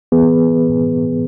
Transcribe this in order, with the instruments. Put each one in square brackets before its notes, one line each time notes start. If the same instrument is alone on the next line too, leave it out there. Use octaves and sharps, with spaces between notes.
[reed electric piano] E3 B3 G#4 B4